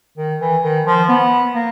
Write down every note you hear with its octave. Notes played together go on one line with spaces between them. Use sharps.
D#3
E3
D#3
F3
B3
A#3